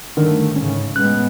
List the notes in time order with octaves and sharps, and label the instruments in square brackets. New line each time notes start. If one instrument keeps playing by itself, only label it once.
[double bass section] G1 A3 [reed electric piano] D3 D#3 A#4
[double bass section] G#2 C#3 [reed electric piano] C#4
[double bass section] A2 G#3 B3 [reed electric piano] F#6